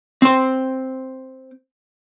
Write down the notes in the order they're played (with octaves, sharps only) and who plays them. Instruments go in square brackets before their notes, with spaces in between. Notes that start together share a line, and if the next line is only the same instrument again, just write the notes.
[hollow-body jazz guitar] C4 C5